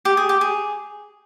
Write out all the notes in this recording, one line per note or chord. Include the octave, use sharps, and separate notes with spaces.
G4
G#4
G4
G#4